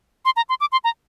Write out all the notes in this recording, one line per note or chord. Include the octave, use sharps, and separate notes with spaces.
C6
A#5
C6
D6
C6
A#5